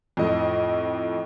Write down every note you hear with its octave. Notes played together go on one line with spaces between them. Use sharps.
F2 A2 D#5